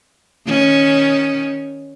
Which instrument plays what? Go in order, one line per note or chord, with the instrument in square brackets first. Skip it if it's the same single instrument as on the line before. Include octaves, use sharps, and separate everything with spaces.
[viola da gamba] D#3 C#4